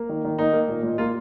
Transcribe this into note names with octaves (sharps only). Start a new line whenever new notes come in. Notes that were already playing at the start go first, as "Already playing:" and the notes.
Already playing: A#3
D#3
D#3
A#3 D#4
A#3
A#2
A#2
A#3 F4